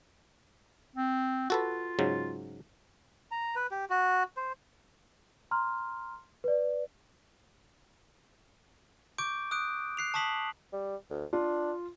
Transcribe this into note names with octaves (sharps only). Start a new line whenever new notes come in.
C4
F4 F#4 A4 B4
G#2 C#3 F#3
A#5
B4
G4
F#4
C5
A#5 C6 F6
B4 D5
C#6 D6 G6 D7
D#6 F#6 D7
F#6 C7 F7
A5 C#6 D#6 B6 F#7
G3
D2
D4 F4